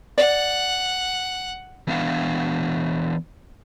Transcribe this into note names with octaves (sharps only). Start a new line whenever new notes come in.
D5 F#5
E3 B3 D4 F5 F#5